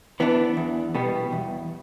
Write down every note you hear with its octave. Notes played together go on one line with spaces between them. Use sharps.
E3 B3 D4
E2
B2 G3 B3
E2